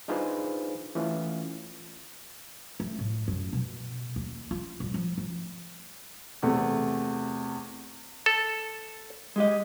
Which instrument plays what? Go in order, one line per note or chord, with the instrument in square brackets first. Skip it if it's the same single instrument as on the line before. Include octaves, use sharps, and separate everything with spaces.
[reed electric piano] D4 D#4 F4 G#4 B4 C5
E3 A3 C#4 F4
[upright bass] A3
A2
F#2
B2
D#2
F4
D#1
F3
F3
[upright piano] E2 C3 A3
[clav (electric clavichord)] A4
[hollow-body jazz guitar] G#3 G4 D#5